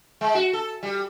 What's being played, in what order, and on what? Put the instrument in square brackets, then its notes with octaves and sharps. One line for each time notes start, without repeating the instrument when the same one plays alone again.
[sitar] G#3
F#4
A4
G3